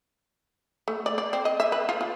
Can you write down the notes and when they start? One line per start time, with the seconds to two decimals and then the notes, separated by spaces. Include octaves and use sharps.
0.88 A3
1.06 D5
1.18 D5
1.33 C4
1.45 D#5
1.60 E5
1.72 B4
1.89 F4
2.01 F4